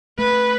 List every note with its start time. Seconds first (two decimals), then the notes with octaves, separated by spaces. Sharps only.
0.18 A3 B4